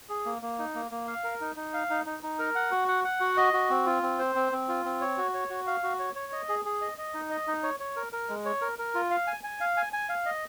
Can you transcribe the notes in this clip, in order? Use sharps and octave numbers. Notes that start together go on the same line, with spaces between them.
G#4
A#3
A#3
D#4
A#3
A#3
F5
A#4
D#4
D#4
F5
D#4
D#4
D#4
A#4
F#5
F#4
F#5
F#5
F#4
D#5
F#4
C4
F4
C4
C5
C4
C4
F4
C4
C#5
F#4
C#5
F#4
F5
F#4
C#5
C#5
D#5
G#4
G#4
D#5
D#5
D#4
D#5
D#4
C#5
C#5
A#4
A#4
G#3
C#5
A#4
A#4
F4
F5
G#5
G#5
F5
G#5
G#5
F5
D#5